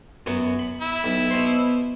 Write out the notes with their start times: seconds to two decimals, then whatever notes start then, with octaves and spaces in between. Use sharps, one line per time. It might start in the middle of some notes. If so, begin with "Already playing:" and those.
0.26 F#2 F#3 B3
0.59 B5
0.81 E4
1.04 B1
1.30 B2 C5